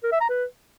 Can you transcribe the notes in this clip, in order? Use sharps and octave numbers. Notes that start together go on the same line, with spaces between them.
A#4
E5
A#5
B4